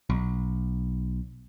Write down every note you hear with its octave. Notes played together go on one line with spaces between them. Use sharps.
B1